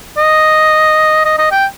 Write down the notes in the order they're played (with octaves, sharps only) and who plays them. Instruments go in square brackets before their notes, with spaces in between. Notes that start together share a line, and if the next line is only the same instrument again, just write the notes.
[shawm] D#5
D#5
D#5
G5